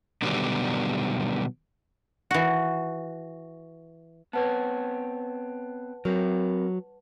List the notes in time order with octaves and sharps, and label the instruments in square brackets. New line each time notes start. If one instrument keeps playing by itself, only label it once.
[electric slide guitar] B2 D3 D#3 F#3 G3 B3
[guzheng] E3 F#4
[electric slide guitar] B3 C4 C#5 [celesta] B4 F#5 A5
[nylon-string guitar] F#3 [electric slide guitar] C4 A#4